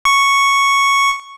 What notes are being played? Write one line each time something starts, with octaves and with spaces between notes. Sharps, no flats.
C#6